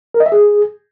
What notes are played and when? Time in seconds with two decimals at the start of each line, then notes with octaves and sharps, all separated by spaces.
0.14 A#4
0.20 D#5
0.26 E5
0.32 G#4